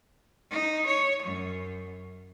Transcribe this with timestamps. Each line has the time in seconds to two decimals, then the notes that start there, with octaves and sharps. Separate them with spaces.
0.51 D#4
0.86 C#5
1.23 F#2